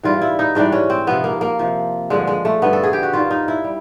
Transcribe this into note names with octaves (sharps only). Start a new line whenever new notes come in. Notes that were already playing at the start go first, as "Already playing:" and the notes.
G#2 E3 G3 F4
E4
D#4
G#2 E3 G3 D4
C#4
C4
C3 F3 B3
A#3
A#3
C3 F3
G2 D3 F3 G#3
G#3
A3
G2 D3 F3 B3
A4
G#4
G4
F#4
G2 D#3 G3 F4
D#4
E4
G3